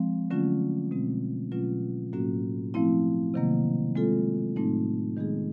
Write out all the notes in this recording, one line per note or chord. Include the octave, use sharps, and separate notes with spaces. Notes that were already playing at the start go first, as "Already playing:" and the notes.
Already playing: F3 G#3 C4
D3 F#3 A3 C#4 F4
B2 G#3 C4
B2 F#3 A3 C#4 F4
A2 F#3 A#3 C#4 F#4
F3 A3 C4 E4
C3 D#3 F#3 A#3
G#3 C4 F4 A4
A2 F#3 A3 C4 D#4
D#3 G#3 B3 D#4 G#4